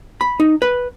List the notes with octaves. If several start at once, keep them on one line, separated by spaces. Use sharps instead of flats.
B5
D#4
B4